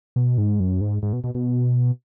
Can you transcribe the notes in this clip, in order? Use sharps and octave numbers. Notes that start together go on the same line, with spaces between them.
B2
G#2
F#2
G#2
G#2
B2
B2
B2